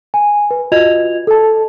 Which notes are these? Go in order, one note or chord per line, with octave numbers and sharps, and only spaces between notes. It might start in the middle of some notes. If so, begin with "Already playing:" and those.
G#5
B4
F4 F#4 D#5 G#6 F7
A4 A5